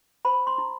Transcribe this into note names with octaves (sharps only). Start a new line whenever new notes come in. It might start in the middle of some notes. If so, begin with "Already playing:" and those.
C5 B5
C6
E4